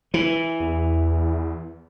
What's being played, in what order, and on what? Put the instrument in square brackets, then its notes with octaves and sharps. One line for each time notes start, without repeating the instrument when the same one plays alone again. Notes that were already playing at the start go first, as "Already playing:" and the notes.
[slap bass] E3
[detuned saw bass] E2